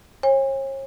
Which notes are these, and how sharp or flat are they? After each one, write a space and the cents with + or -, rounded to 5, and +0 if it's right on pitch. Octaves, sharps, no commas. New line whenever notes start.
C#5 -40 G#5 -40